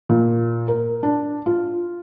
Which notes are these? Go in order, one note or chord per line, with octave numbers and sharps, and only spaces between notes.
A#2
A#4
D4
F4